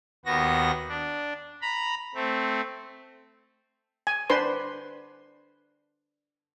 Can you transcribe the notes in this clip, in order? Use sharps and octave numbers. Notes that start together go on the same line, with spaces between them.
D#2 B3 F#4 A#6
D4
A#5 B5
A3 C4
G#5
D4 B4 C5 C6